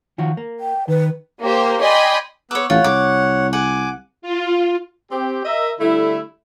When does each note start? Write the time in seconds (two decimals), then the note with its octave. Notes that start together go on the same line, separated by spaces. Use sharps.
0.18 D#3 F3 F#4
0.37 A#3
0.60 G5
0.88 D#3 B4
1.42 A#3 G4 A#4 C5
1.82 D5 D#5 G5 G#5 B5 C6
2.51 B3 C#5 D6 E6 F#6
2.70 A1 F4 C#5 F#5
2.84 C2 D6
3.53 F#5 G#5 D6
4.22 F4
5.12 C4 G4
5.45 A#4 D#5 E5
5.80 D3 G3 A3 E4